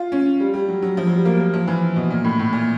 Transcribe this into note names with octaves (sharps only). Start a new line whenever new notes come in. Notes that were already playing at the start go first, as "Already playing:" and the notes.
Already playing: F4
C#4
G3
G3
F#3
F#3
F3
F#3
G3
A#3
A#3
F3
E3
B2
A#2
A2
A2
A#2